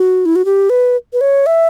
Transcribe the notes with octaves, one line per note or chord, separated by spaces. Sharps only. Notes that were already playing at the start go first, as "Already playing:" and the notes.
Already playing: F#4
E4
F#4
G4
B4
B4
C#5
E5